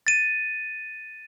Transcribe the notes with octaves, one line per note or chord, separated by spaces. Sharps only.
A6 D#7